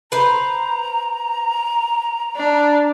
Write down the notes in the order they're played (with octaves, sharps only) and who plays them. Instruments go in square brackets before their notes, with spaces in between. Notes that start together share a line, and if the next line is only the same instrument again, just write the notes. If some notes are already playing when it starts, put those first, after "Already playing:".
[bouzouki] B4 C5 [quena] A#5
[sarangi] D4